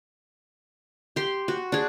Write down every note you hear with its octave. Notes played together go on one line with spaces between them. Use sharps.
G4 C6
F#4
D4 G#4